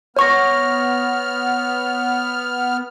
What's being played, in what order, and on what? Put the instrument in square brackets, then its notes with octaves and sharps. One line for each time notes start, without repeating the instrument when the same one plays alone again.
[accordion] B3 F6 [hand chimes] C#5 C#6 A#6